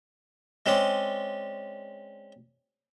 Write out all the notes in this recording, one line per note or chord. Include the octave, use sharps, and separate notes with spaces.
G#3 C4 C#4 D5